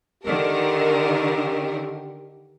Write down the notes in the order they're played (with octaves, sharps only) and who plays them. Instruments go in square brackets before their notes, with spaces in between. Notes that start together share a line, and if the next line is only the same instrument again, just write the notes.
[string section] D3 D#3 A#4 [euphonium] G4